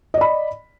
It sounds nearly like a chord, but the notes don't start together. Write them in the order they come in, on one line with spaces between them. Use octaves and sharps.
D#5 D5 B5